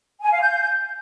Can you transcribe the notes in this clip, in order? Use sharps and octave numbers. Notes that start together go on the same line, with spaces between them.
G#5
F5
G6